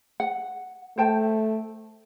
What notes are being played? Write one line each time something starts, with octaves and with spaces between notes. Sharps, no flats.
F#5
A3 C5 G5 A5